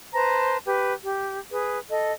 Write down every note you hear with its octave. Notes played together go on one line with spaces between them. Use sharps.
B4 C5 A5 A#5
G4 B4
G4
G#4 B4
A4 D#5